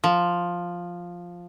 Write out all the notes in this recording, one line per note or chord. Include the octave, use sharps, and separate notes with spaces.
F3